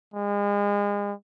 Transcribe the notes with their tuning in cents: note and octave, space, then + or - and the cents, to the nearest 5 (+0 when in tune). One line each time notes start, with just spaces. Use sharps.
G#3 -35